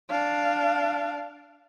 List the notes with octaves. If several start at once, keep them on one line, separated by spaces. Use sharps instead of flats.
D4 F5